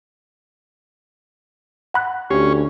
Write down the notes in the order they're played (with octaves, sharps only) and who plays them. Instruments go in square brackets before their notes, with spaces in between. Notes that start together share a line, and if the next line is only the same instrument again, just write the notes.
[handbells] F#5 B5 F#6
[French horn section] D2 [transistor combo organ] C#4 [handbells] G4